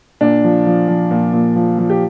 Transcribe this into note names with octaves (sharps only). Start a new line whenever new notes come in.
A#2 D4
F3
F3
F3
A#2
A#2
F3
F3
G4